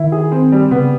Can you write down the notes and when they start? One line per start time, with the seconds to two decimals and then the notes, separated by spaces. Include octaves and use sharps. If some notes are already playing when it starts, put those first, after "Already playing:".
Already playing: D#3 E4
0.12 G#4
0.32 C4
0.52 G3
0.71 C#3 B3